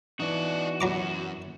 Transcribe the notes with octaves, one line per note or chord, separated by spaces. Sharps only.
E3 B3 D#4 F#4 D5
F#2 F#3 A#5 D6